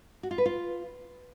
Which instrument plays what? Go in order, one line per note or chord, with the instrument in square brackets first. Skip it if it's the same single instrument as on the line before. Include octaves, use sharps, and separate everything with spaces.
[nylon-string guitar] F#4
F4
B4
F4